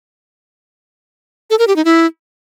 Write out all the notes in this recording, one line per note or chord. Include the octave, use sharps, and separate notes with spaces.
A4
A#4
G4
D#4
E4